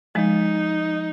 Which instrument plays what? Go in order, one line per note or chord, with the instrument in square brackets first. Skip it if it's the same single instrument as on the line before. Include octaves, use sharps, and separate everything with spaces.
[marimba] F3 G#3 [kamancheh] D#4